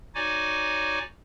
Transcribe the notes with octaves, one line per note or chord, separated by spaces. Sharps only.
D#4 F#4 C#5 D5 G#5 D6